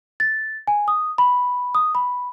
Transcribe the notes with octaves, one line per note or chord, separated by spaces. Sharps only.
A6
G#5
D#6
B5
D#6
B5